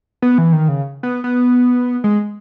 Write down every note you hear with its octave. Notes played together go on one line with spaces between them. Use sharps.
B3
E3
D#3
C#3
B3
B3
G#3